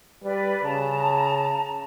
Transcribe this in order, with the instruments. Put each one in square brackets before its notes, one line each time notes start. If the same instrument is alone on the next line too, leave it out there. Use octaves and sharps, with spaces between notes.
[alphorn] G3 [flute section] B4 D5
[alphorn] C#3 [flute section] A5 A#5